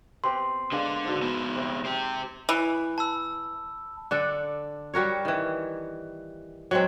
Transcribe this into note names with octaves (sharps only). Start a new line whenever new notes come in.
B3 C4 G4 C6
D3 G#3 A#3 B3 D4
G#2 B2
F3 B3
C3
G4 C5
E3
A5 B5 E6
D3 D4 A4
G3 F#4 A#4 C#5
D#3 E3
F#3 G#3 C4